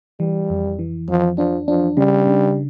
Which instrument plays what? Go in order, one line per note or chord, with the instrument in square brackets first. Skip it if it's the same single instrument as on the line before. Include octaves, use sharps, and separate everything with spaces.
[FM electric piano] E3 [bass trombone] G3
[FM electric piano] F2
E3
[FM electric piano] F2 [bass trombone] F3
[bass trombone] F3 [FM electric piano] D4
[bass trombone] F3 [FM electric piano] D4
[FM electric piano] C#3 [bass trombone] G3
[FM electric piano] C#3